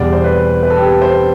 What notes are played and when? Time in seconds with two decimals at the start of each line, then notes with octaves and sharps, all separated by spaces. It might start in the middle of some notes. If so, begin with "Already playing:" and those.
Already playing: E2 B2 G3 D5
0.13 C5
0.24 B4
0.63 B4
0.70 A4
0.78 G4
0.85 A4
1.01 C5